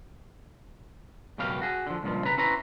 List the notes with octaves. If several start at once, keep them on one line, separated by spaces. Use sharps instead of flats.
C#2 F#2 B2 G4 F5
F#4 G#4
D3 F3
C#2 G2 A#2 F3
C#3 B4 A#5
C#4 E4 B4 C5 A#5